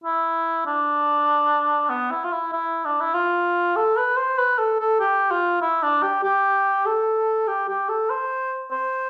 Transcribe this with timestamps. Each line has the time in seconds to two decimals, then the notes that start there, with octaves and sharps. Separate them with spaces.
0.04 E4
0.66 D4
1.89 B3
2.11 E4
2.24 F4
2.32 E4
2.52 E4
2.85 D4
3.00 E4
3.14 F4
3.76 A4
3.97 B4
4.17 C5
4.38 B4
4.58 A4
4.79 A4
5.00 G4
5.31 F4
5.62 E4
5.83 D4
6.03 G4
6.23 G4
6.86 A4
7.47 G4
7.68 G4
7.89 A4
8.10 C5
8.71 C5